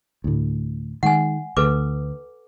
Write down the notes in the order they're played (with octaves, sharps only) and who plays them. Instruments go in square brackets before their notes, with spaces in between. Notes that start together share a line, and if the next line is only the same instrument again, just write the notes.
[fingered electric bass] D2 A2
[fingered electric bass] D#3 G#3 [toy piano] F#5 G#5
[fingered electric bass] D2 [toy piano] A4 B4 D6